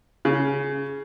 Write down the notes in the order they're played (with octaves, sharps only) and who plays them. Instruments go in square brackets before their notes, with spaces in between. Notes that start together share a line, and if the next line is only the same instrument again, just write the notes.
[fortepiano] C#3